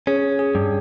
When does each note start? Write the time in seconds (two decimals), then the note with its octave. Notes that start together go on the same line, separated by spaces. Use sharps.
0.07 C#4 G#4
0.39 G#4
0.55 G2